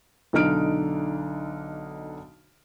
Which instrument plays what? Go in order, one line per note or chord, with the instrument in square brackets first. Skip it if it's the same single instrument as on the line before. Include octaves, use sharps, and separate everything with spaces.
[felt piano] B1 D3 D#4 F6 D7